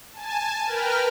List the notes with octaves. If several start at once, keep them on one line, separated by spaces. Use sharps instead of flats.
G#5 A5
A#4 B4 G5 F6